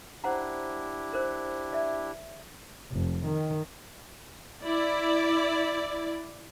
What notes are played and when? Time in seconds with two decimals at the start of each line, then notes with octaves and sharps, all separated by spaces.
0.24 D4 E4 G4 C5 F#5 A#5
1.13 A#4 C5
1.73 D5 E5
2.93 F1
3.26 D#3
4.64 E4 D5